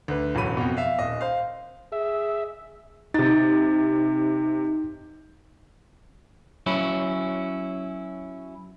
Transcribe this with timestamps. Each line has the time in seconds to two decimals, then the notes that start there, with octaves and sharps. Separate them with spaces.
0.08 D2 B4
0.35 E1 A1 F#3 B5 D#7
0.57 F2 B2
0.77 E5 F5
0.99 D#1 D#5
1.21 C5 F5
1.92 G#4 E5
3.14 C3 D#4 A6
6.66 F#3 C#4 E4